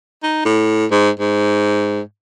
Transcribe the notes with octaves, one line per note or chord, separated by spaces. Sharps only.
D#4
A2
G#2
G#2